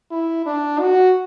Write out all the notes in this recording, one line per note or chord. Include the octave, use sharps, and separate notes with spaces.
E4
D4
F#4